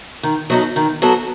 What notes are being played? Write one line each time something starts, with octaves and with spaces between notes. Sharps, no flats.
D#3
F#3 B3 D#4 A4
D#3
F#3 B3 F#4 A4